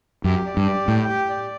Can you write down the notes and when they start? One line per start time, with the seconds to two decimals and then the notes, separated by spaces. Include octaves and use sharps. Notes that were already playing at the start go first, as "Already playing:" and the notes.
0.24 F#2 G4
0.46 D5
0.57 G2
0.67 G4
0.88 A2 G5
1.09 G4
1.30 D5